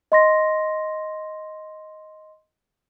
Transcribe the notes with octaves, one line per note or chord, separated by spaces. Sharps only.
D#5 C6 A#6